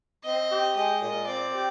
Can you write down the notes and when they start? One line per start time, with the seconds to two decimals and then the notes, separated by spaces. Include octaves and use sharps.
0.24 C4 D#5
0.51 G4
0.76 G#3 D#5
1.01 A#2
1.27 C4 D5
1.54 G4